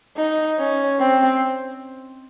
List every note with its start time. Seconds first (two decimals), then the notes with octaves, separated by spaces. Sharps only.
0.17 D#4
0.59 C#4
1.00 C4